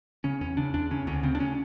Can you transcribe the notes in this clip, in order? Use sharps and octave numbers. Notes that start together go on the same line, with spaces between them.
C#3 C#4
E2 C#4
C#3 D4
E2 D4
C#3 C#4
D2 C#4
C#3 C4
D4
C#4